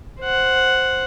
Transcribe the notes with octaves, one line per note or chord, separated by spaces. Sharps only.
C5 F#5